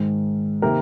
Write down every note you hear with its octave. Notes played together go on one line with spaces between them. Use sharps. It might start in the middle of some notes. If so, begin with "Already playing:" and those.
Already playing: G#2 D#3 G#3
C3 D#3 A#3 G4 A#4